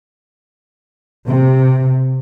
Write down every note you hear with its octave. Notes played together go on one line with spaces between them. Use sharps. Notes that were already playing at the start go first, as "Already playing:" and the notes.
C3